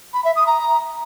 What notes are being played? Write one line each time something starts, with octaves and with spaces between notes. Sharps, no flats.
B5
E5
D#6
A#5